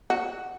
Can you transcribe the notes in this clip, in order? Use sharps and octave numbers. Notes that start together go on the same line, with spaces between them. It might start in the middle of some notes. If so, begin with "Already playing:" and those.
F#4